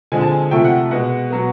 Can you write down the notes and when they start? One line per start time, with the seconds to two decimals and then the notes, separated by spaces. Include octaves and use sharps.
0.12 D3 F3 G#3 C4 G#5
0.21 A5
0.31 G#5
0.51 C3 F3 A3 G5
0.64 F#5
0.91 B2 G#3 B3 F#5
1.30 B2 F#3 B3